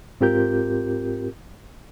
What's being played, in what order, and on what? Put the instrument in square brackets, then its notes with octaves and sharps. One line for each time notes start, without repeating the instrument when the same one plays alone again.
[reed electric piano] G#2 C4 F4 G4 A#4 G6